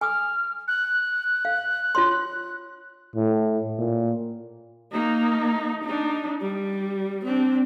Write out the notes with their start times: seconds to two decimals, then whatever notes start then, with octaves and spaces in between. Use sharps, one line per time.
0.01 G#5 D6 D#6 F6
0.68 F#6
1.45 F5
1.95 F4 C#5 C6
3.15 A2
3.78 A#2
4.92 A#3 D#4
5.84 D4 D#4
6.41 G3
7.25 C4 D4